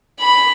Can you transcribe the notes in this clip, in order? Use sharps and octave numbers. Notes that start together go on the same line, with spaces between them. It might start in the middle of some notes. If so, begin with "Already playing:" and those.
B5